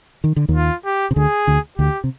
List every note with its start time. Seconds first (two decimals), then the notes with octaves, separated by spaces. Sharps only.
0.24 D#3
0.36 D3
0.48 D#2 D#3
0.55 F4
0.85 G4
1.11 C3
1.16 D2 D3 G#4
1.47 D2 D3
1.78 D2 D3 G4
2.04 C3